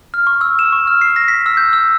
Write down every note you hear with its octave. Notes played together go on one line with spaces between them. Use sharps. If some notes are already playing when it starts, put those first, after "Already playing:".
F6
C#6
E6
E7
C#6
F6
C7
A#6
B6
E6
G6
E6